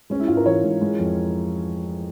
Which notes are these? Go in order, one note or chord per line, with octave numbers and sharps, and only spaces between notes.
G#3 C#4
E4
G#2 F4
A#4
E3 C#5
G#2
G#3
F2